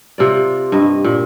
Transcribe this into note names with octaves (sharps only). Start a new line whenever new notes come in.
C3 F4 D5
G2 D#5
A#2